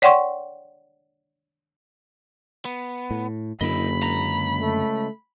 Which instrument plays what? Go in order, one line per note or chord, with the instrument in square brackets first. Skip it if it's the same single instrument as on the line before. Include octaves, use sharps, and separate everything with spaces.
[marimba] C#5 D5 F#5 G5 C6 C#6
[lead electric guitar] B3
[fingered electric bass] A2
[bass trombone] F#1 [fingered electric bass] F#2 D3 A#3 [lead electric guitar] E4 D#5 [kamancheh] B5
[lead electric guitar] C#2 A#5
[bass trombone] A3